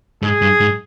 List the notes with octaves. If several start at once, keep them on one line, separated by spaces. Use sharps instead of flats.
G#2 G#4
G2
G#2